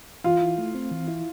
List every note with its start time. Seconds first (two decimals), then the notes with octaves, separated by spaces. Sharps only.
0.24 E3 F4
0.41 E4
0.58 A3
0.75 C4
0.91 E3
1.08 E4